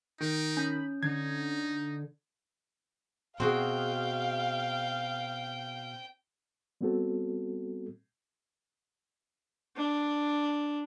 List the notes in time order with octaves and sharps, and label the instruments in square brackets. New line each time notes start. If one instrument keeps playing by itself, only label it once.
[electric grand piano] D#3 [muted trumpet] D#4 [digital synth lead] D7
[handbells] C#4 [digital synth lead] B5
[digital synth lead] D3 [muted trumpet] D#4 [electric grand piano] G#6
[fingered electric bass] B2 [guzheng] C4 F#4 G#4 [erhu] F5 [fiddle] G5
[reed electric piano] G3 B3 C4 F#4 A4
[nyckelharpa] D4